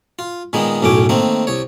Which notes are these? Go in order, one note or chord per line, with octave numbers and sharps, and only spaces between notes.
F4
A#2 D#3 G#3 A#3 B3
B1 F#2 A2 C#4 D6
D#3 A3 A#3 C4
C2 C#5